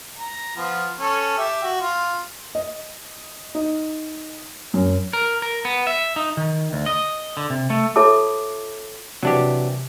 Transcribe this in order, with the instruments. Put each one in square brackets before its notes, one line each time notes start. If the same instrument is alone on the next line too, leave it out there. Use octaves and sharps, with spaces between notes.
[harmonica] A#5
F3 B3
C#4 A4
G4 E5
F#4
F4
[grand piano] D#5
D#4
F#2
[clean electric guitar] A#4
A#4
B3
E5
D#4
D#3
D2
D#5
D3
C3
A3
[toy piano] F4 A4 C#5 E5 A5 D6
[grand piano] C3 E3 [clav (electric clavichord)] F#3 D4 G4